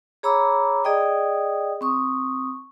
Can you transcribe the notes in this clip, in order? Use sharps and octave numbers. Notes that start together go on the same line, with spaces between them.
G#4 C#5 A#5 B5 D6 E6
G#4 D5 D#5 G5 D#6
C4 C#6 D#6